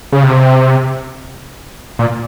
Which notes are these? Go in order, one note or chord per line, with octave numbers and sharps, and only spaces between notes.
C#3
C3
A#2